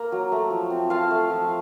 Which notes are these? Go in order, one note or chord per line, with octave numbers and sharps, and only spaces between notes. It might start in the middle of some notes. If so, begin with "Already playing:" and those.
Already playing: A#3
F#3
A3
F3
C4
F4 F5 A5
A3
F3